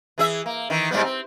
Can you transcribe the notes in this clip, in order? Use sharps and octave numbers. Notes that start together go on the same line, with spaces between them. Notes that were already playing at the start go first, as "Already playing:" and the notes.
E3 G#4 E5
A#3
D#3 E3
G#2 G3 B3
C4